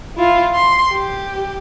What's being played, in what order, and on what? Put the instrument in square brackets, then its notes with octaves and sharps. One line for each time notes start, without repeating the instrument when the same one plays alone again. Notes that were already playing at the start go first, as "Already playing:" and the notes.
[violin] E4 F4
C6
G4